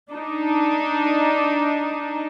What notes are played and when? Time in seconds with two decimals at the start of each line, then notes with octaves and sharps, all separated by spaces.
0.12 D4 D#4